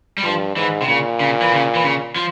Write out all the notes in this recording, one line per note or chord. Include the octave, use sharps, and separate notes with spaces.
G3
G2 F3
G#2 E3
C3
A#2 C#3
C#3
E3
C#3
E3
C#3
F3